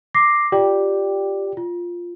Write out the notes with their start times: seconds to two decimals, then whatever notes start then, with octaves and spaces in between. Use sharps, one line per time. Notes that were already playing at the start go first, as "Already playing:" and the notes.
0.15 D6 A#6 C7
0.52 F4 G4 D5 G5
1.57 F4